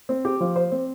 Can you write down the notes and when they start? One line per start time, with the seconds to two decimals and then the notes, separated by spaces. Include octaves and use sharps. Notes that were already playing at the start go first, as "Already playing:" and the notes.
0.09 C4
0.25 G4
0.40 F3
0.56 C5
0.72 C4